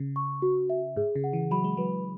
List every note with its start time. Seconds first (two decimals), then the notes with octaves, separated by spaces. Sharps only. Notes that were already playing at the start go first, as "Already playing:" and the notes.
Already playing: C#3
0.16 C#6
0.42 F#4
0.70 E5
0.96 G#2 G#4
1.15 C#3
1.24 F#5
1.33 E3
1.51 F#3 B5
1.64 G#3
1.77 F#3 B4